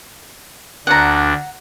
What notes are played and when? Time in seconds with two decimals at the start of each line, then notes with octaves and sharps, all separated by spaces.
0.87 D2 D4 F#5 A#5